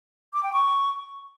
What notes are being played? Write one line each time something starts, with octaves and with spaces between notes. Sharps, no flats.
D6
G5
C#6